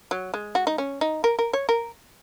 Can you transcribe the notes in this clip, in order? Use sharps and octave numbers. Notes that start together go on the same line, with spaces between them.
F#3
G#3
F#4
D#4
C#4
D#4
A#4
A#4
C#5
A#4